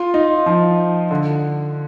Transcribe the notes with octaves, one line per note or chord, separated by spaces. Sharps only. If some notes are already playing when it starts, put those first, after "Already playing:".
Already playing: F4
D#4
F3
D3